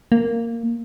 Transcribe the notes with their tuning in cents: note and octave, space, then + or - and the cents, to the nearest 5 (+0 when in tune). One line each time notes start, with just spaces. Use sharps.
A#3 -10